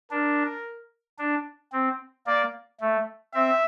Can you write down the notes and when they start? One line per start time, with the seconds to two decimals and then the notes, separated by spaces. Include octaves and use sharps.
0.11 D4 A#4
1.19 D4
1.73 C4
2.26 A#3 D5
2.80 A3
3.34 C4 E5